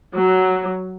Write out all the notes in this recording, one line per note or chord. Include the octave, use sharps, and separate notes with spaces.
F#3